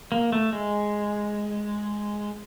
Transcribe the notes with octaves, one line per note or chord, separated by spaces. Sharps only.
A#3
A3
G#3